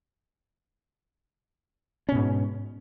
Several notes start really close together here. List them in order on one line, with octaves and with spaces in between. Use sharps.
C#4 B2 G#2